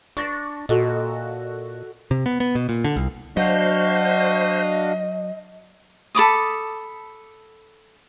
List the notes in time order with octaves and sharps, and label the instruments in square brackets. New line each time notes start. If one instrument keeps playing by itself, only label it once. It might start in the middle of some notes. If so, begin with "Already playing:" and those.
[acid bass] D4 [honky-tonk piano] C#6 A6 A#6
[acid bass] A#2 [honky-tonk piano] F#4 A4 D#5
[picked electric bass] C3
B3
B3
B2
A#2
D3
C2
[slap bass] F#3 [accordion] D4 F#4 F5 [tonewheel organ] C5 [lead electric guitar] D#5
[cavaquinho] A4 B5 D6 D#6